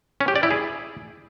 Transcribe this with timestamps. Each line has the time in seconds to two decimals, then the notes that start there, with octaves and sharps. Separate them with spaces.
0.21 C#4
0.28 G4
0.36 D5
0.43 E4
0.51 G#4